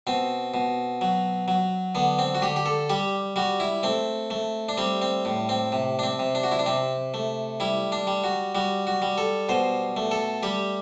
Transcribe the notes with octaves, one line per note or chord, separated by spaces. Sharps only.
B2 C4
B2
F#3
F#3
D3 B3
C4
F#4
D3 G4
G4
A4
G3 G4
G3 F#4
E4
A3 C4
A3
D4
G3 C4
C4
A2
C4
C3
D4
C4
C3
D4
F#4
E4
D4
C3 C4
A3
G3 E4
D4
G3
F#4
G3 F#4
F#4
G3
A4
B2 C5
A3
A4
G3 G4